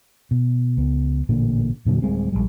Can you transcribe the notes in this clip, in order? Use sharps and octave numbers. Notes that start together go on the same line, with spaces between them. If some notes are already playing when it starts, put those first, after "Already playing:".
B2
C#2 B3
A1 A#2 D3 A#3
E2 A#2 D3 F#3
D1 G3 G#3 C4
A#1 F#2 G3 G#3